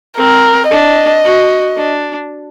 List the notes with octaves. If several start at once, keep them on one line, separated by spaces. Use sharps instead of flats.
C4 A#4
D4 D#5
F#4
D4